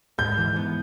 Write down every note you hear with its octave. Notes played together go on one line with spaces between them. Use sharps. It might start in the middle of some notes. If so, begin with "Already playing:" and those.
G#2 G6
E3
B3